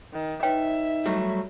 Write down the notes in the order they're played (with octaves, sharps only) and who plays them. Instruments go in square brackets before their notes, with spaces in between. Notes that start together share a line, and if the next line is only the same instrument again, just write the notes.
[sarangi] D#3
[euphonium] D#4 [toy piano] B4 C#5 G5 [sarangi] E5
[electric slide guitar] F#3 G3 A3